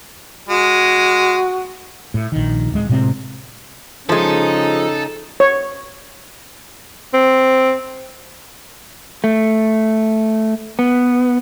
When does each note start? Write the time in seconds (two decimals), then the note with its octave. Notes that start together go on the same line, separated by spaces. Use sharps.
0.49 G#3 F#4
2.14 A2
2.32 A#1 D#3
2.72 D1 G#3
2.89 A2 C3 G#3 C4
4.09 C#3 F3 G#3 D#4 A4
5.40 C#5
7.13 C4
9.24 A3
10.79 B3